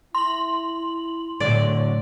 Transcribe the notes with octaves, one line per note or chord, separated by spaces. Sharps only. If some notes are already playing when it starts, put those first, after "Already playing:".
E4 C6 F#7
A2 D3 F#3 D5